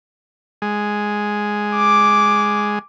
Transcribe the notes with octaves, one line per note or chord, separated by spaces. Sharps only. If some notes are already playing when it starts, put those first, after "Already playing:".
G#3
D6